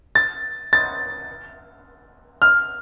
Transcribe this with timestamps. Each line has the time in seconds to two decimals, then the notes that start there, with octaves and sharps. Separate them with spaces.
0.15 A6
0.73 A6
2.42 F6